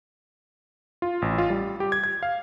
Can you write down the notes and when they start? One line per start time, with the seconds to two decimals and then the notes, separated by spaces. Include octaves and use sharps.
1.02 F4
1.22 A1
1.38 F4
1.50 G3
1.80 G4
1.92 G#6
2.04 G#6
2.23 F5